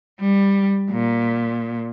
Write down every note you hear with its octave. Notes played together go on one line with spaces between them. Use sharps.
G3
A#2